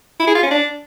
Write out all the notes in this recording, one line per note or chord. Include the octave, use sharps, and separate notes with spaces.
E4
G#4
F4
C#4
D4